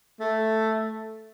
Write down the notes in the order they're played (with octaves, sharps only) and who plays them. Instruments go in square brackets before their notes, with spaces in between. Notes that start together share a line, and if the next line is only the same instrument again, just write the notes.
[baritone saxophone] A3